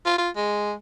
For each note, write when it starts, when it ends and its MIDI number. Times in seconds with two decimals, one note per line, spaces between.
0.06 0.16 65
0.18 0.30 65
0.36 0.74 56